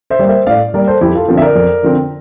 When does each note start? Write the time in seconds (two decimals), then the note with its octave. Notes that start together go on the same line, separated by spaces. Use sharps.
0.10 C5 E5
0.19 G3 A#3
0.29 C5 E5
0.47 A2 D5 F5
0.74 G3 A#3 A#4 D5
0.87 A4 C5
1.01 F2 E4 G4
1.15 F4 A4
1.28 D3 F3 C4
1.37 E5
1.42 A#4 D5
1.56 F2
1.83 D3 F3 C4